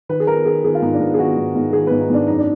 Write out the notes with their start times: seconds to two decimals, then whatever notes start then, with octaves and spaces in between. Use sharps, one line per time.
0.09 D#3 B4
0.20 G#4
0.27 D#3 A#4
0.46 D#3 G#4
0.65 D#3 G#4
0.75 F4
0.82 G#2 D#4
0.94 D4
1.00 G#2 B3
1.14 G#4
1.19 D#3 F#4
1.37 G#2
1.55 G#2
1.73 D#3 G#4
1.87 G#2 B4
2.01 D#4
2.10 G#2 D4
2.27 F#2 D#4
2.39 D4